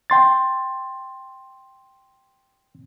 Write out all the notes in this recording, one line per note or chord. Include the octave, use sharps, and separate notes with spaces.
G5 C6 A6